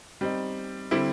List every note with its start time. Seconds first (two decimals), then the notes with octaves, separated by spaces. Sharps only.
0.21 G3 C4 D#4
0.91 D3 G3 C4 E4 G4